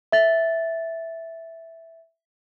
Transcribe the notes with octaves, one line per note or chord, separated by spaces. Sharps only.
E5 A6